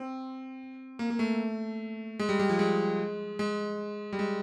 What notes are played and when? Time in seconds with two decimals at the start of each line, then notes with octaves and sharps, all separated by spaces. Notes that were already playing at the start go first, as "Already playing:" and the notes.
Already playing: C4
0.99 A#3
1.10 A#3
1.19 A3
2.19 G#3
2.29 G3
2.39 G3
2.49 F3
2.59 G#3
3.39 G#3
4.13 G3
4.19 G#3